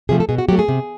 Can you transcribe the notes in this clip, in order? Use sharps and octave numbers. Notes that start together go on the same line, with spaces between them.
C3 F3 A3 G#4
A4
B2 G#4
F#4
F#3 A3 G4
G#4
C3